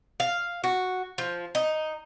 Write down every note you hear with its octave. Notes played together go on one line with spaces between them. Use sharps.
F5
F#4
F3
D#4